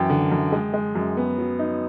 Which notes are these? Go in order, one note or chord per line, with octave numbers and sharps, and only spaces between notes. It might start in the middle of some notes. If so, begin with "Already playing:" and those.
Already playing: F#2 E3 G5
D3
F#2
G#3
G#3
F#2
B3
F#3
D#4